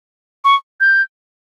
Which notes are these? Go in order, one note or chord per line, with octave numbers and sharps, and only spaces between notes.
C#6
G6